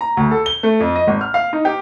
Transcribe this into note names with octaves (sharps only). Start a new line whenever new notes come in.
A#5
D2
A4
G7
A3
F2
D#5
G#1
F6
F5
D#4
G4